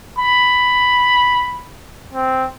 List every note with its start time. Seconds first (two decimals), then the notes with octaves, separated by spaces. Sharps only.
0.19 B5
2.13 C4